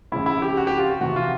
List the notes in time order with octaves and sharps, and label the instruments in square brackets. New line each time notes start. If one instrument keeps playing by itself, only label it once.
[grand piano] F2 C#3 F3 E4
E4
G4
F#4
G4
F4
F#4
F2 C3 E3 F#4
F4